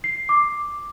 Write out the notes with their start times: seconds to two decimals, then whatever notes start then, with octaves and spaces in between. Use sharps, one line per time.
0.04 C7
0.29 D6